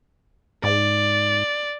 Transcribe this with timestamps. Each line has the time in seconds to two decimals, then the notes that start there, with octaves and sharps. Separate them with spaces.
0.64 G#2 D5